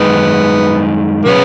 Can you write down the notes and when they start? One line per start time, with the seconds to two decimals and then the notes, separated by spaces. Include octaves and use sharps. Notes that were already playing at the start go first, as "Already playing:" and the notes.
Already playing: F#2 D#3 G#3 B3 D#4
1.25 B2 F#3 B3 C#4 G#4 C#5